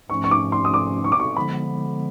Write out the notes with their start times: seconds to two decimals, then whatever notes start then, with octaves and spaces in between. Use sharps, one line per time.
0.10 G#2 F3 A3 C#4 C#6
0.24 C#6
0.31 D6
0.52 C6
0.65 D#6
0.74 D6
1.04 C#6
1.12 D6
1.20 C#6
1.36 D3 F3 G#3 B3 B5